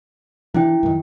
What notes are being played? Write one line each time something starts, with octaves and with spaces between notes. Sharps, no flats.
E3 D4 E4 G5
F#2 D#3